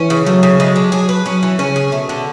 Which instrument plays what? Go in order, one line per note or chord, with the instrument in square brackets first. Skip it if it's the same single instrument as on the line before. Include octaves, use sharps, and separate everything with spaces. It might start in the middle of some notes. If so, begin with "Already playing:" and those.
Already playing: [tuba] E3 [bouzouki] C#4
[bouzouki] C#3
[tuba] F#3 [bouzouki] A3
[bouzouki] C#3
[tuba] F#3 [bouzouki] G#3
[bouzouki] D4
[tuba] F#3 [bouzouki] G#4
[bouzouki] B4
[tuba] F#3 [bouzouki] C#4
[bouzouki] E3
[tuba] C#3 [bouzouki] C#4
[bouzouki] G#4
[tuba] B2 [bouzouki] A3
[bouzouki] D3